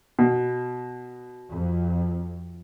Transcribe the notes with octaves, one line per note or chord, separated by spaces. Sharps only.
B2
F2